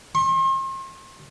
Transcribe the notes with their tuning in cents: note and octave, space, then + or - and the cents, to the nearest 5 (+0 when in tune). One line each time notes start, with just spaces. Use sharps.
C6 +40